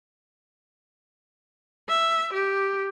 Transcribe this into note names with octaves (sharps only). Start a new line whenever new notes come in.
E5
G4